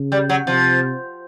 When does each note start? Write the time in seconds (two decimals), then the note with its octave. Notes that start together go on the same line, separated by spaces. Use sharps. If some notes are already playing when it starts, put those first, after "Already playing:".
Already playing: C#3
0.12 G3
0.29 F#3
0.46 C3 F3